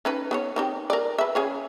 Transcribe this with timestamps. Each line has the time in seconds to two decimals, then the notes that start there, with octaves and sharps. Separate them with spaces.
0.05 C#4 D#4 B4
0.31 B3 C4 C#5
0.56 D#3 C4 G4
0.90 A#4 D5
1.18 B4 E5
1.35 C#3 G#4 C#5